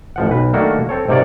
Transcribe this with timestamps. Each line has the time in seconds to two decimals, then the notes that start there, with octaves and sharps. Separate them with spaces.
0.16 A1 F3 F#5
0.29 B1 B4
0.54 D#3 A3 A#3 D4 F#4
0.89 C4 A4 C#5
1.08 G#2 C3 A#3 C#5 D5